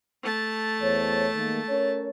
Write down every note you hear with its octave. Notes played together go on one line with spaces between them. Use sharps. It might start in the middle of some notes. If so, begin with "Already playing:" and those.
A3 A5
E2 C5 C#5
D#3 G#3 A#3
C#4 A#4 C#5